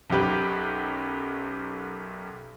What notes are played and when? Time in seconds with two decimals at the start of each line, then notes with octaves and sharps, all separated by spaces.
0.10 B1 F#2 G4 B4